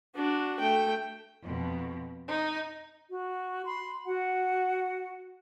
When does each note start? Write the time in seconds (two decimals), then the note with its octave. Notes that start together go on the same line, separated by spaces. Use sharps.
0.16 D4 F#4
0.59 A3 G5
1.43 F2 B2
2.27 D#4
3.10 F#4
3.67 B5 C6
4.05 F#4 F#5